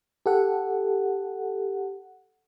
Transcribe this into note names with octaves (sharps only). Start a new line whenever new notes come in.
G4 A4 F#5